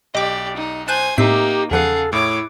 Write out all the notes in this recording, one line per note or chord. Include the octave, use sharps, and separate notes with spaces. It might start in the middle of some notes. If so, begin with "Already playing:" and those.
B1 G4 D5 D#5 D6
D#4
C5 G#5 A5 F#6 G6
A2 A#3 C4 D#4 G4 E5 C7
E2 C#3 F3 G#4 A4 F5 F#5 F#6
A2 E4 C#5 D6